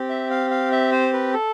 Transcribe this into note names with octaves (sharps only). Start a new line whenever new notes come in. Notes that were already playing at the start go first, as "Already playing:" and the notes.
Already playing: C4 G4
E5
F5
F5
E5
C5
B4
A4